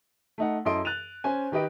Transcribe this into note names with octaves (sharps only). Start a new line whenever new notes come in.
A3 D#4 F#5
F#2 E4 A4 D#5 C6 D7
F#6 A6 D#7 F7
C#4 C5 G#5
D#3 G4 B4 D#5 D7